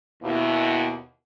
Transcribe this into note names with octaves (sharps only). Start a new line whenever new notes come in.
D#2 B2 E4